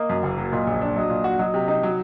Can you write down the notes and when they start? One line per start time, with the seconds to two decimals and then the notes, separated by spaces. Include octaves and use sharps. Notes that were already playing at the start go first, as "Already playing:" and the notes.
Already playing: A#3 D#5
0.09 F#2
0.23 F#1
0.38 F#3
0.53 A#2 D#5
0.67 A#1
0.82 D4
0.96 F#3 D#5
1.10 A#2
1.24 F#4
1.39 F#3 D#5
1.54 C3
1.68 D#4
1.83 F#3